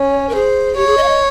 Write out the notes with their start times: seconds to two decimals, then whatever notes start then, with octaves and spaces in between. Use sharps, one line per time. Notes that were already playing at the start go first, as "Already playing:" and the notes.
Already playing: C#4 C#5
0.29 A#4
0.35 G#4 C5
0.76 G4 C#5
0.87 G#4
0.97 D#5
1.03 F5
1.08 D#5